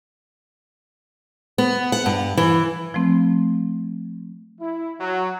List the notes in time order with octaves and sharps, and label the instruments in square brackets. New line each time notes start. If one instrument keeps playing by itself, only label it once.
[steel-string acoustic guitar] B3
F#5
G2
E3
[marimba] F3 A3 C4
[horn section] E4
F#3